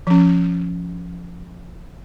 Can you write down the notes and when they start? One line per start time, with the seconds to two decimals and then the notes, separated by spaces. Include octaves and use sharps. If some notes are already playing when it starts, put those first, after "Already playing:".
0.07 F3 C#4